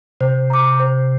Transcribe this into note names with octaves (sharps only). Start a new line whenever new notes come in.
C3 C5
A#5 D6
C5